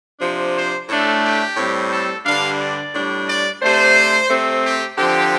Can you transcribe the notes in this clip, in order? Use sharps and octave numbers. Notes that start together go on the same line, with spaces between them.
C3 F3 D4
C5
A2 A3 D4 A4
G4
A2 G3 C4
A4
G2 D3 G3 D4 F5
D5
A2 G3 D4
D5
C3 A3 D4 C5
C3 A3 C4
G4
D3 F3 C4 G4